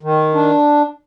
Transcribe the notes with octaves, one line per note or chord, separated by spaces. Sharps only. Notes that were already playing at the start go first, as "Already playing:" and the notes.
D#3
D4